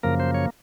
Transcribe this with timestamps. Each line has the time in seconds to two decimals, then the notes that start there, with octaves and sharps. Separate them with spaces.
0.03 F#2 C#3 F3 A#3 A#4
0.20 C5
0.34 C#5